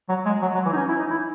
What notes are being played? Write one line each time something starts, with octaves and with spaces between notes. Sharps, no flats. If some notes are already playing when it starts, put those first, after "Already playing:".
F#3
G#3
F#3
F#3
E3
D#4
C#4
E4
D#4
E4